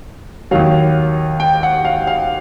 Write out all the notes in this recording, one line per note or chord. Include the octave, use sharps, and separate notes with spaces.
D#2 D#3 F#3 F5
G5
F#5
F5
F5